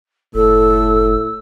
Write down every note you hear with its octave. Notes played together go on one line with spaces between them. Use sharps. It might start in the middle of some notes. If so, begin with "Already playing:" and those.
F#1 A2 A4 E6